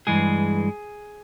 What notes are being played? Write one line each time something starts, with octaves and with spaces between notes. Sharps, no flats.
G2 E3 G#3 G#4